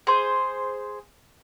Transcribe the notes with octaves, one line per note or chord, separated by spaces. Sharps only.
G#4 C5